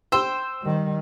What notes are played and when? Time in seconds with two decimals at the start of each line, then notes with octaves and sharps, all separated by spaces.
0.12 C5 G5 E6
0.62 D#3 G3